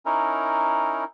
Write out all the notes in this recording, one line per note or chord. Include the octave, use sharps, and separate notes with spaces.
C#4 D#4 E4 A#4